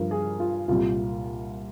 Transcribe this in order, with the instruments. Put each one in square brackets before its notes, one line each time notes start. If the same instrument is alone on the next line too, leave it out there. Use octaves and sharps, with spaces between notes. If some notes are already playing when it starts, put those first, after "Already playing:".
Already playing: [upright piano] G2 F3 A#4
G#4
F4
C2 A#2 G3 F4